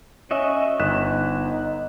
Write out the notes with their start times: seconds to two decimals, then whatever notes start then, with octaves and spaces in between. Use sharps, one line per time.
0.31 C#4 F#4 D#5 E5
0.80 G1 D#4 F#6 B6 E7